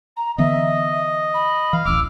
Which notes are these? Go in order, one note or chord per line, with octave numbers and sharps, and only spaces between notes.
A#5
D3 E3 B3 D#5 E5
B5
E3 F5
D1 A1 D6 E6 F6